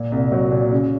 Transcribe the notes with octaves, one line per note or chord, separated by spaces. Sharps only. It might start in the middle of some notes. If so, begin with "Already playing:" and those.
Already playing: A#2
C2
F#3
A#2
C#3